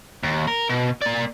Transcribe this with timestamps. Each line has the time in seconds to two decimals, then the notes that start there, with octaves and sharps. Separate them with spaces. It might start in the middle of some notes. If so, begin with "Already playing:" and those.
0.23 D#2
0.47 A#4
0.69 B2
1.02 A#3 D5